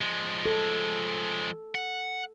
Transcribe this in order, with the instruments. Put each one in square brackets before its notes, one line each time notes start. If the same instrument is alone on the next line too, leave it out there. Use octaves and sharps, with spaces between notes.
[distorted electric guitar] F3 G#3
[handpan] A4
[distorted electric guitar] F#5